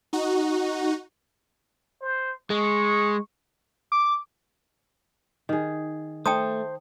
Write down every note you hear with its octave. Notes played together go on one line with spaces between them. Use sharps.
D#4 F#4
C5
G#3 C#6
D6
D#3 G#4
A3 C5 G5 A5 D#6